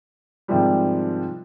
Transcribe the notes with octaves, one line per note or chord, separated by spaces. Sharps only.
G#2 C3 D#3 F3 G3